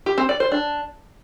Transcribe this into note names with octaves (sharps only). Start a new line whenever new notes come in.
G4
C4
D5
C5
D4